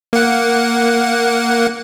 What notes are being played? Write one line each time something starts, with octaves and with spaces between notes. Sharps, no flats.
A#3 F#5